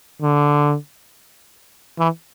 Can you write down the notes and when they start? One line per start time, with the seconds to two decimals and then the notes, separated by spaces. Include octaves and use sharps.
0.22 D3
1.99 E3